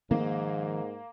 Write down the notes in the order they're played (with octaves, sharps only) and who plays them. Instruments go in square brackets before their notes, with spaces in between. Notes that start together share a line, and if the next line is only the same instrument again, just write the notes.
[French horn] G#2 [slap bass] D#3 F3 G#3 [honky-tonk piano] A#3